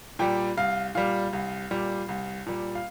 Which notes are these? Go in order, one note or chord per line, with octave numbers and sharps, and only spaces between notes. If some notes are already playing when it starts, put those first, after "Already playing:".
A#2 G3 G5
C2 F5
A#2 G3 F5
C2
A#2 G3
C2
A#2 G3
F5